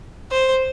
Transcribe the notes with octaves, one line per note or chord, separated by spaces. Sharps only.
C5